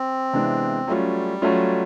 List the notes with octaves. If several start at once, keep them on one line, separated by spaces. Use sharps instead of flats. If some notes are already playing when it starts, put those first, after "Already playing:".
Already playing: C4
C3 E3 G#3 B3 D4
F#3 G3 A3 C#4 F4
F#3 A3 C#4 F4